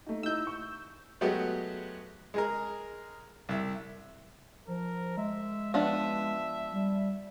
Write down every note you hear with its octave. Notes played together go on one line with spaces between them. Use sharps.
A3 D#4
D#4 E4 E6 G6
C#6
F#3 G#3 A3 B3 F#4 G4
G#3 G#4 A#4
C2 E5
F3 A#4
G#3 E5
F3 B3 D4 E5
G3